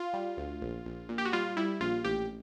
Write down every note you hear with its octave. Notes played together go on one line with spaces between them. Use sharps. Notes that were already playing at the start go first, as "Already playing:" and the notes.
Already playing: F4
G3
D2
A#1
A#1
A#2
G4
F#4
G3 F4
G3 E4
A#1 F4
A1 G4